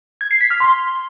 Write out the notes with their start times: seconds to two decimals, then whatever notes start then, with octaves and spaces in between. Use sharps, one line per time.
0.21 G#6
0.31 C7
0.41 B6
0.50 F6
0.60 C6